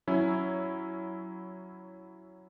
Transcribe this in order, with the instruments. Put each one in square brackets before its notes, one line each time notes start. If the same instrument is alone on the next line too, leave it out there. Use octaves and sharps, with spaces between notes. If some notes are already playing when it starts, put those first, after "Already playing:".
[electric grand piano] F#3 C#4 E4